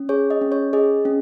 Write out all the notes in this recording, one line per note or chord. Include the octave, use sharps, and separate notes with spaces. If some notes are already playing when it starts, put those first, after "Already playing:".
Already playing: C#4
G#4 C#5
D#5
C#4
C#5
G#4 D#5
C#4